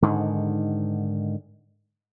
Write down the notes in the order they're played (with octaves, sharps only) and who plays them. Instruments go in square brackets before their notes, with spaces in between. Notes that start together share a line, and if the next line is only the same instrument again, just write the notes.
[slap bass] G#2 D3 D#3